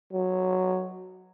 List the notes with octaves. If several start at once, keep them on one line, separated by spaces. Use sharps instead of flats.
F#3